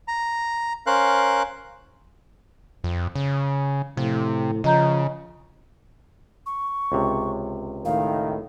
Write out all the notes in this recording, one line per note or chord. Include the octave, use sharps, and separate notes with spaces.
A#5
C#4 A#4 C5 F5 F#6
F2
C#3
A2 C3 F3
C#3 F3 D#5 A#5 G6
C#6
C#2 C3
A2 D#3 F5